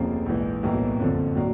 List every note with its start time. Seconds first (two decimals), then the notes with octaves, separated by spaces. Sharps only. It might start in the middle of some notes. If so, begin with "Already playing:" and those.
Already playing: F1 F2 C#3 F3 A#3
0.26 A#1 G#2 E3
0.63 B1 A2 E3 G3 A#3
1.00 F#1 F2 D3 F3
1.35 A2 F#3 A#3 D4